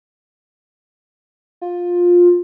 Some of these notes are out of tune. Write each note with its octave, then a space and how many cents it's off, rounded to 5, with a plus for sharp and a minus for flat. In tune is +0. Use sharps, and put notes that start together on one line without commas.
F4 +15